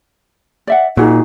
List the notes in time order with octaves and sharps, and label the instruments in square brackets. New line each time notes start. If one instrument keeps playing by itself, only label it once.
[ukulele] D5 E5 F#5
[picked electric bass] A#2 [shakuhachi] D#4 [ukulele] F#4 G#4